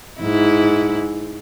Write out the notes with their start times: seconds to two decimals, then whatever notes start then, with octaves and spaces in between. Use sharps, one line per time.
0.20 G#2 E4